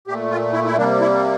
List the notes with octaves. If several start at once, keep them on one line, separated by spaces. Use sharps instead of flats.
A#2 A3 G4
F4
E4
E4
C3 G3 A#3 D4
E4